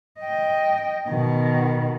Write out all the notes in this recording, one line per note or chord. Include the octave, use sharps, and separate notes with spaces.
D#5 G5
B2 D#3